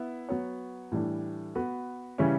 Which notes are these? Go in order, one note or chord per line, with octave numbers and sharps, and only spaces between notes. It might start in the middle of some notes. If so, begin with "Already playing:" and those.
Already playing: B3 E4
F#3 B3 F#4 C#5
A2 E3 G3 D4
B3 F#4 B4
C#3 E3 G3 C#4 E4